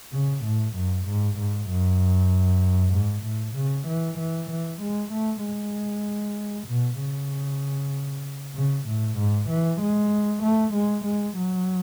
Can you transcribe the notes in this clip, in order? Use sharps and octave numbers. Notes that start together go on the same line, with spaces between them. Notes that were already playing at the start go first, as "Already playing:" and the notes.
C#3
A2
F#2
G#2
G#2
F#2
G#2
A2
C#3
E3
E3
E3
G#3
A3
G#3
B2
C#3
C#3
A2
G#2
E3
G#3
A3
G#3
G#3
F#3